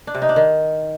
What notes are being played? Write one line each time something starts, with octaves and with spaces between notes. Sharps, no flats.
D4
C3
D#4
D4
D#3